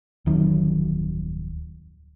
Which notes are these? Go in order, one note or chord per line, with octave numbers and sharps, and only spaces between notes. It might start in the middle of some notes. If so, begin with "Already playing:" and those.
D1 F2 D#3 F#3